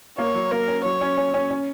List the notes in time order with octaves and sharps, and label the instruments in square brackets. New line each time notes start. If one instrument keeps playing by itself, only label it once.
[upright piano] A#3 [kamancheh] C#5
[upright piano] F#3
[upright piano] A#3 [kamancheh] A#4
[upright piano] C#4
[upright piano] F#3 [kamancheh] C#5
[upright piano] C#4
C#4
C#4
C#4